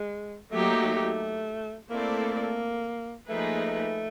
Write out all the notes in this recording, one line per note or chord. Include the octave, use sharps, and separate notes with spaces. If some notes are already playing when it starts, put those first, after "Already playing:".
Already playing: G#3
F#3 A3 A#3 D#4 G4
A3 A#3 C4 E4 A4 D5
F3 A3 A#3 D#4 G#4 B4